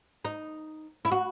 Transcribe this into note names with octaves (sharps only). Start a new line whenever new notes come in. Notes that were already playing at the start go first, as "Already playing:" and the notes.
D#4
E4
F#4